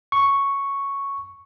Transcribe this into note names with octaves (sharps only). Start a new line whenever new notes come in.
C#6